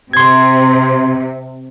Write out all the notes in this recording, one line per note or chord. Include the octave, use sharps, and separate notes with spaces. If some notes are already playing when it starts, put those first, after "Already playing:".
C3 C6 G#6